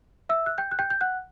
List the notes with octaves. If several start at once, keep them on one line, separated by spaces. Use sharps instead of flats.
E5 E6
F#6
G5 G6
F#6
G5 G6
G6
F#5 F#6